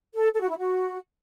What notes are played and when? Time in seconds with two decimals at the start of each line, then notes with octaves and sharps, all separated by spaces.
0.13 A4
0.33 A4
0.41 F#4
0.49 E4
0.58 F#4